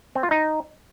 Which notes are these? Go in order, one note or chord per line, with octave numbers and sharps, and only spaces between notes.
C4
F4
D#4